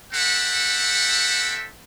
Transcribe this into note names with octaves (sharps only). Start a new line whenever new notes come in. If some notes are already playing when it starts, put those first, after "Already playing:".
C4 G4 A4 E5 F#5